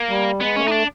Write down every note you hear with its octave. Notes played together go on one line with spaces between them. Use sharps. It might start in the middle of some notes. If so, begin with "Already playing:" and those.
Already playing: A#3
G3
G#3 B3
A#3 C#4
A3
D#4
D4